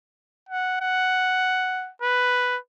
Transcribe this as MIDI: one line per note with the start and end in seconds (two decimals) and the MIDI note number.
0.49 0.76 78
0.81 1.90 78
2.02 2.57 71